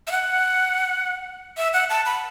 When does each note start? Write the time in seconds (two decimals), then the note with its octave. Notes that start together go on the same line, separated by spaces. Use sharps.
0.07 E5
0.11 F#5
1.57 E5
1.73 F#5
1.90 A5
2.06 B5